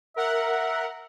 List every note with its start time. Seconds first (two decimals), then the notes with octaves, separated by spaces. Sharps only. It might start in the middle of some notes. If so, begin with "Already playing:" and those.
0.16 A#4 E5 F#5